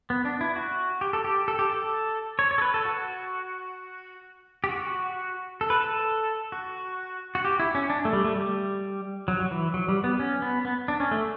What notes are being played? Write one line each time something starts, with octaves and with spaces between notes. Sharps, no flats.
B3
D4
E4
F#4
G4
A4
G4
A4
G4
A4
C#5
C#5
A4
B4
A4
F#4
G4
F#4
A4
B4
A4
F#4
F#4
G4
E4
C#4
D4
A3
G3
A3
G3
F#3
F#3
E3
F#3
G3
B3
C#4
B3
B3
D4
C#4
A3